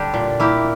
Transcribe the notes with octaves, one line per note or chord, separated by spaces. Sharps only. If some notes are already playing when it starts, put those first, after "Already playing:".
Already playing: D3 G3 D4 G4
A#2
A#3 E4 G4